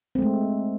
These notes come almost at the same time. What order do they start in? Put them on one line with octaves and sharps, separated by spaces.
C4 A3 G#3